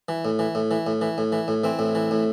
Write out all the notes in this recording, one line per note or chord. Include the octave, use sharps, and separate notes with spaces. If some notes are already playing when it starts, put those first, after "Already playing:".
E3
A2
E3
A2
E3
A2
E3
A2
E3
A2
E3 C4
A2
E3
A2